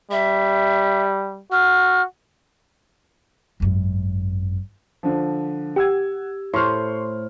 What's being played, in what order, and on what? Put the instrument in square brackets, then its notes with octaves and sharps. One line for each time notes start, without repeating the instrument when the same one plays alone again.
[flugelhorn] G3 [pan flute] E5
[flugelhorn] F#4 [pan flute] F6
[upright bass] G#1 F#2
[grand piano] D3 F3
[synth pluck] G4 [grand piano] F#5 E6 G#6
[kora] A2 C5 [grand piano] C6 C#6 F6